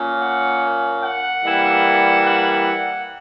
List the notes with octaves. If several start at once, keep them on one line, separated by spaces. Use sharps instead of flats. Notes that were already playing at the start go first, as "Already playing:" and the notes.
Already playing: A#2 A#3 C#4
F#5
F#5
E3 G3 A#3 E4
F#5
F#5